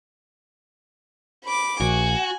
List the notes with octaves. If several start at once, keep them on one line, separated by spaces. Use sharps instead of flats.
B5 D6
A#1 F#4 G#5